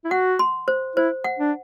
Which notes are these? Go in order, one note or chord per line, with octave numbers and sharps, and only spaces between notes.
E4
F#4 F#5
C6
C5
E4 C5
F#5
D4